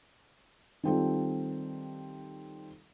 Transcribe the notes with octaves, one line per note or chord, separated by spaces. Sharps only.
D#3 G3 C4 F4 A4